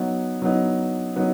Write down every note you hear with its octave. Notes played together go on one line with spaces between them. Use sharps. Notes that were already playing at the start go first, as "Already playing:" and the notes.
Already playing: F#3 B3 D#4
F#3 B3 D#4
F#3 B3 D#4